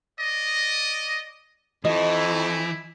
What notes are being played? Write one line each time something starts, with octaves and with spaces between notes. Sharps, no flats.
D5 D#5
F2 E3 D#4 E4 D#5